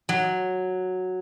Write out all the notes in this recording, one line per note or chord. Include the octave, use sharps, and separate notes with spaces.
F#3